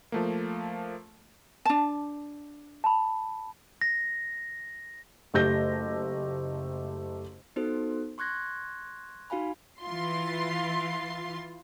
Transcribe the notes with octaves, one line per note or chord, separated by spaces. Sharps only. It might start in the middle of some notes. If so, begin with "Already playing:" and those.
F3 A3 A#3
D4 A5
A5 B5
A#6
F#1 A3 G4 G6 A#6
B3 D#4 F#4 A4 C5
C6 C#6 F#6 G#6 A#6
D#4 F#4 F5 G#5 B5
E3 F4 C6